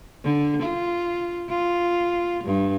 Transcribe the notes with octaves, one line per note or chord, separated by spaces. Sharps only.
D3
F4
F4
G2